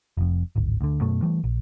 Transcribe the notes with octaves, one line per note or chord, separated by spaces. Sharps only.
F1 F2
D1 G#1
D2 D3
F#2 B2 A3
E3 G3 A3
A#1